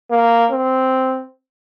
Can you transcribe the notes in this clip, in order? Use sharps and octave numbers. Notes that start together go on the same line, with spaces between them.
A#3
C4